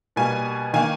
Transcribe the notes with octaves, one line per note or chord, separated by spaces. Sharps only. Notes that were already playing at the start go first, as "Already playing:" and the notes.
B2 G3 A#3 G#5
D#3 A#3 G#5